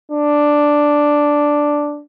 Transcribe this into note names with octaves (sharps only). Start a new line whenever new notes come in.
D4